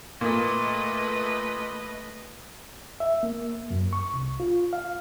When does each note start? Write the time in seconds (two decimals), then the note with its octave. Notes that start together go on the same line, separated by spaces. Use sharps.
0.21 A#2 A3 B4 D#5
3.00 E5
3.23 A#3
3.70 F#2
3.93 C#6
4.14 C2
4.40 F4
4.73 F5